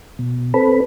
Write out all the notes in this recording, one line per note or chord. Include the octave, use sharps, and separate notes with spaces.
B2
C4 A4 B4 B5